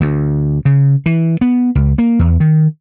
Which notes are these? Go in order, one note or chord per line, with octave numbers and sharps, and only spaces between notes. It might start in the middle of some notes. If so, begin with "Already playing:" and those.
D2
C#3
E3
B3
C#2
A#3
E2
D#3